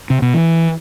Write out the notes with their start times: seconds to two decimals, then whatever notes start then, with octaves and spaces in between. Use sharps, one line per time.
0.10 C3
0.22 B2
0.34 E3